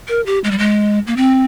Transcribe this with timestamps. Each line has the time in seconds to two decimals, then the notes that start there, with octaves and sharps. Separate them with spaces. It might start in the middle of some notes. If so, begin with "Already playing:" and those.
0.09 A#4
0.26 G4
0.44 G#3
0.51 G3
0.58 G#3
1.07 A#3
1.17 C4